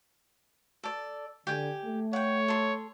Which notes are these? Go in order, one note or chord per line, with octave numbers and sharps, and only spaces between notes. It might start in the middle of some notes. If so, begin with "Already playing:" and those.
A4 D5
D3 G4 G5 G#5
A3
C#5 F#5 G5
A4 C6